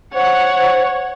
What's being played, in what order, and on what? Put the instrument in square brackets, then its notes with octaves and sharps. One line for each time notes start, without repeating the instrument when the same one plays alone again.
[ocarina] C5 [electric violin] C#5 [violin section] F#5